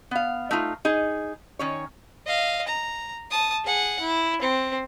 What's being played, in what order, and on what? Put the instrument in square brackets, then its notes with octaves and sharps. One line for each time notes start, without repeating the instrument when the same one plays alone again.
[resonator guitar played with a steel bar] B3 F5
A3 D#4 F4
D#4 G#4
D#3 C#4 C#5
[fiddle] D#5 F5
A#5
A5 D#6
G#4 F#5
E4
C4